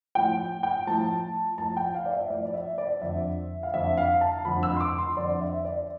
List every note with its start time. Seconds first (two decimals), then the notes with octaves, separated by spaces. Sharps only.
0.15 A2 F3 G5
0.63 G5
0.87 A2 F3 A5
1.58 A2 F3 A5
1.77 G5
1.95 F5
2.06 D5
2.13 E5
2.30 A2 F3 D5
2.45 D5
2.54 E5
2.78 D5
3.02 F2 D3 F3 E5
3.63 F5
3.74 F2 D3 F3 E5
3.97 F5
4.21 A5
4.45 F2 D3 F3 B5
4.63 E6
4.77 C6
4.80 D6
4.98 C6
5.17 F2 D3 F3 D5
5.41 E5
5.65 D5